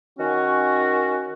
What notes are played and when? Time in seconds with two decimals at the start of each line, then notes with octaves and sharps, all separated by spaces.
0.19 D#3 C#4 F#4